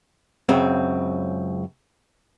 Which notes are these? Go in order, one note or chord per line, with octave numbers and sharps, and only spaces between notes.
C#2 F#2 C#3 C4